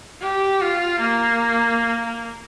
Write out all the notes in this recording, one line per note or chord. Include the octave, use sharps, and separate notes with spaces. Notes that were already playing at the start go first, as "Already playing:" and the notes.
G4
F4
A#3